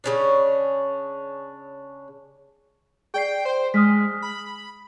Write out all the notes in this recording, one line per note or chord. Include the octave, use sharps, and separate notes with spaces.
C#3 C#4 D4
G#4 D5 G5 C7
C5
G#3 D#6 F6 B6
B5